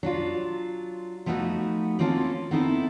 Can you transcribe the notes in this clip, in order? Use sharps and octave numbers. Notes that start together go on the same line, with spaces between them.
F#3 D4 F4
F3 A3 B3 D#4 F#4
A#3 C4 C#4 F4 G4 A4
B3 C4 D#4 E4 G#4 A4